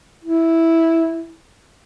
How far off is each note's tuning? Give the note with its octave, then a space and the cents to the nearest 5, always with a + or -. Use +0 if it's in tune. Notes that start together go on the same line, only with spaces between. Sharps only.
E4 -5